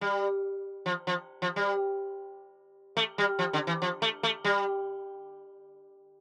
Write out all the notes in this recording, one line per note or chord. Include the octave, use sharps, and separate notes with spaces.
G3
F3
F3
F3
G3
A3
G3
F3
D3
E3
F3
A3
A3
G3